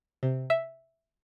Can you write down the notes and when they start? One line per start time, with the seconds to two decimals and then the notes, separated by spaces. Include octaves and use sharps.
0.23 C3
0.50 E5